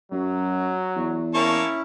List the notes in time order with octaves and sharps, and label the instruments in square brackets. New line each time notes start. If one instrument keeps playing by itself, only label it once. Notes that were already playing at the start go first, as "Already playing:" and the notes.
[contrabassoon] F#2 [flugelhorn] F#3
[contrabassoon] E2
[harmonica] A#3 C#5 A5 [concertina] C#4 E4